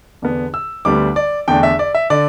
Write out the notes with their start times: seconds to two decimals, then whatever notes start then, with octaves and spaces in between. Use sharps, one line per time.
0.22 E2 D3 B3 D4
0.54 E6
0.85 D2 D3 G3 B3 D4 D6
1.16 D5
1.48 E2 D3 A3 D4 G5
1.63 E5
1.79 D5
1.95 E5
2.10 D3 D5